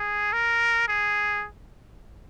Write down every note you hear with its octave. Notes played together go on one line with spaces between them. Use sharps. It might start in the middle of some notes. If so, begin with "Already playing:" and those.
Already playing: G#4
A#4
G#4